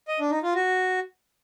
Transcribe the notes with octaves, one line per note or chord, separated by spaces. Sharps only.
D#5
D4
D#4
F4
F#4